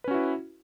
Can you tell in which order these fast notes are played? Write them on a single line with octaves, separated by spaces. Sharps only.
B4 C#4 F#4 E4